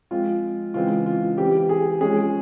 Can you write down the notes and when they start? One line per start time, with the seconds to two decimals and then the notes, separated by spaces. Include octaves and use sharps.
0.11 F3 G#3 C4 F4
0.74 C#3 E3 G#3 C4 F4
1.06 F4
1.37 E3 G3 C4 G4
1.69 G#4
2.01 F3 G#3 C#4 G#4